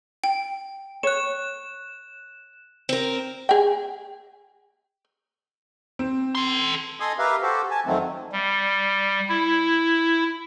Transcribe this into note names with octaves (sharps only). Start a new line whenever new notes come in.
G5
C#5 F#6 E7
C4 A#4
G#4 G5
C4
A4 C6
A4 D#5 G#5 C6 D#6
G4 A#4 B4 E5 F5
F#4 G4 A4 C5
G#5 A5
F2 D#3 F#3 A3 C4
G3
E4